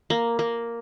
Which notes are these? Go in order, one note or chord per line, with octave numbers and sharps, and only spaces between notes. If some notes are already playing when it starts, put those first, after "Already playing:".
A#3
A#3